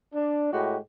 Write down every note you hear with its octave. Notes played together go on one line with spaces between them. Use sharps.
D4
A2 G#3 F#4 G4